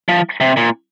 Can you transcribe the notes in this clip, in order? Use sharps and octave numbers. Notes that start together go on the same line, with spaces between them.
F3
C3
A#2